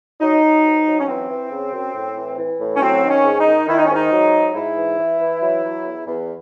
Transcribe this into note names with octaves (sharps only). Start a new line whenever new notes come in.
F#3 D#4
F#3
G#2
F#3
C#4
E3 C4
E3
C#3
F#2
A2
E3
E3
A2
C#4
F#3 C4
D#3
C#4
G#2
D#4
D#3
D#3 E4
D#4
C#4
G#2 D#4
F#3
G#2
G#2 E4
E3
E3
E3
F#3
F#3
E2
E2